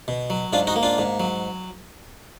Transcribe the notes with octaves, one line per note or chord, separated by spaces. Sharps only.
B2
F#3
G#2 D4 F4
D#4 F#4
A#3
D4 F4
G#2
F#3